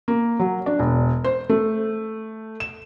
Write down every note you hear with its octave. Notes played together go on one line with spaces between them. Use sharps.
A#3
F#3
D4
E1
C5
A3
E7